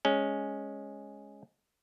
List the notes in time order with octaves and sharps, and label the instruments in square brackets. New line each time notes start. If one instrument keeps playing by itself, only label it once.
[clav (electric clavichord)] G#3 C#4